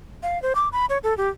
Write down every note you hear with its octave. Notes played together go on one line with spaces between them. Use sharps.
F5
C5
D6
B5
C#5
A4
G4